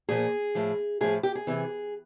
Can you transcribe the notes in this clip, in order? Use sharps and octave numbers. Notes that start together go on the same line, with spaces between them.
A#2 F3 G#4
A2 F3
A2 F3 G#4
G4
G#4
C3 E3